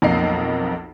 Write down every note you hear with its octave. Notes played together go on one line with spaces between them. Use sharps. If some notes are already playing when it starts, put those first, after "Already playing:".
B1 F2 A#3 A#4 D#5 C7